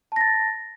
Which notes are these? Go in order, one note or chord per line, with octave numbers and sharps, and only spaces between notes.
A5 A6 A#6